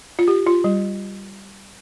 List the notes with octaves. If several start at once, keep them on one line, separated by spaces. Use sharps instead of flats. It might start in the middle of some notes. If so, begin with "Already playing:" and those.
F4
G4
F4
G3